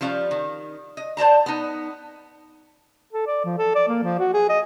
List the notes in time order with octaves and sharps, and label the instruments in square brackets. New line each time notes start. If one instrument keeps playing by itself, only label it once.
[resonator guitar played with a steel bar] F3 G3 C#4 F5
D#3
D#5
C5 D5 A5 A#5
B3 D#4
[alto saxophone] A4
D5
F3
A4
D5
A#3
F3
F#4
G#4
D#5